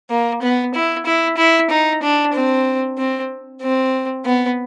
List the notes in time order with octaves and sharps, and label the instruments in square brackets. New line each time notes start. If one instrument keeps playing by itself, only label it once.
[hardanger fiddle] A#3
B3
E4
E4
E4
D#4
D4
C4
C4
C4
B3